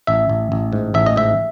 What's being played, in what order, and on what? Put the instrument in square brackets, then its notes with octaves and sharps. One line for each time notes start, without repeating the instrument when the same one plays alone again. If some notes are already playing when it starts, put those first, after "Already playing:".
[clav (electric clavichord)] A1 E5
A1
A1
G#2
A1 E5
D#5
G#2 E5